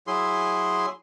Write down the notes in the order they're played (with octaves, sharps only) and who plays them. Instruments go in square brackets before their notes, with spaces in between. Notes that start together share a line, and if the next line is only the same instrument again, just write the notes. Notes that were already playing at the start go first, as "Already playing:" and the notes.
[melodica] F#3 E4 G#4 C6